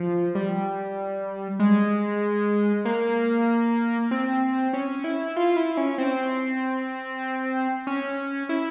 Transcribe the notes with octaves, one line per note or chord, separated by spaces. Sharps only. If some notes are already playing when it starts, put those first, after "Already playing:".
Already playing: F3
G3
G#3
A#3
C4
C#4
E4
F4
E4
C#4
C4
C#4
E4